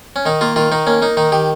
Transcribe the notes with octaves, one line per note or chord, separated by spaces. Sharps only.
C#4
D#3 D#4
A#3 F4
D#3 F4
D#3 D#4
A#3 C#4
A#3 D#4
D#3 D#4
D#3 G4